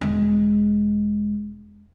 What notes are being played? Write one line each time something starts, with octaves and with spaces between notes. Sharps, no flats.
E1 G#3